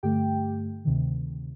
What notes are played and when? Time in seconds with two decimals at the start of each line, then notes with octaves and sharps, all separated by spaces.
0.03 G2 D3 A3 G4 G5
0.85 D2 C3 D#3